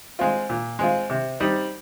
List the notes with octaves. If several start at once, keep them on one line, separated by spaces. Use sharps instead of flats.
G#3 C4 F4
A#2
G#3 C4 F4
C3
G3 C4 D#4